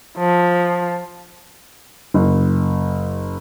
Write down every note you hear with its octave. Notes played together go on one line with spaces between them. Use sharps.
F3
F#1